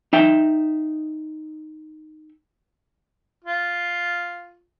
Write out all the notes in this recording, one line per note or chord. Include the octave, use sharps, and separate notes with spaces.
D#4 E5 G5
F4